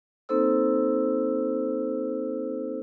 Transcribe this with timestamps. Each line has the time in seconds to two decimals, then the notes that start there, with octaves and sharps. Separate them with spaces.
0.29 A#3 C4 D#4 A4 C5 E6